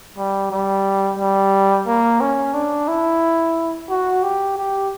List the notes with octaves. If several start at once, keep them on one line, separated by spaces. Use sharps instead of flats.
G3
G3
G3
A#3
C#4
D4
E4
F#4
G4
G4